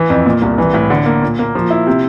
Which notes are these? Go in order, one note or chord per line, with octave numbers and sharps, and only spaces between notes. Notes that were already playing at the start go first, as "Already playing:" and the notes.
Already playing: E3
F2
A#2
C2
E3
A2
D3
A#3
A#2
A#3
F3
E4
C3